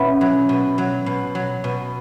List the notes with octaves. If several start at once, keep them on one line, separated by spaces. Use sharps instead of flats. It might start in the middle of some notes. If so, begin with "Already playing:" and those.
Already playing: B2 B3 C#4 E4
F#3
B2
F#3
B2
F#3
B2